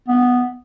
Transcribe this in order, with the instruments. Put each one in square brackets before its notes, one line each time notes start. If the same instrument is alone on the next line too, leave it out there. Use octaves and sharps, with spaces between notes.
[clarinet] B3